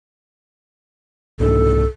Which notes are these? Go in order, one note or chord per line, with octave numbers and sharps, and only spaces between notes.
C2 G#2 D4 A4